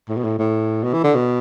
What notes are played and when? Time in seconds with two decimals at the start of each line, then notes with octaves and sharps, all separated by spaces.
0.09 A2
0.17 B2
0.24 A2
0.39 A2
0.84 B2
0.94 E3
1.04 D3
1.15 B2